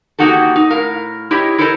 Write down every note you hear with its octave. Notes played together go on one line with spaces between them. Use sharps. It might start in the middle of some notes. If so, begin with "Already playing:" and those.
A#3 D#4 F#4 G4 A4
D#4
A2 A#4 F5
E4 G4 C#5 D#5
E4 A4 A#4 C5 C#5 D#5